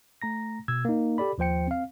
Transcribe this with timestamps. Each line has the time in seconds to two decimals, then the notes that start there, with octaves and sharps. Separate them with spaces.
0.22 A3 A#5 A#6
0.68 B2 E6 G#6
0.85 A#3 D#4
1.18 G4 A4 D5 B5
1.38 D#2 F3 C5 G5 C#7
1.67 C4 F5